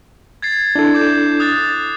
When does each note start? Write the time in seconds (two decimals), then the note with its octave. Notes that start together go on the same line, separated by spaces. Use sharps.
0.42 G#6 A6 C7
0.76 D4 E4 A4
0.94 D6 G6
1.40 D#6 F#6 A6